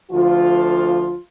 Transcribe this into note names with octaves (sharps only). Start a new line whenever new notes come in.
D2 D3 F3 F4